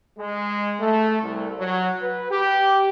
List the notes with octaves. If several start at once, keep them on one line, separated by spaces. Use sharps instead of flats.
G#3
A3
C2
F#3
B4
G4